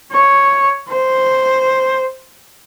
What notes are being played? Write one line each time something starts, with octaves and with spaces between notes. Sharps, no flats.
C#5
C5